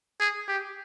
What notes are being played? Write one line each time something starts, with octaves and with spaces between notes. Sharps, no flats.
G#4
G4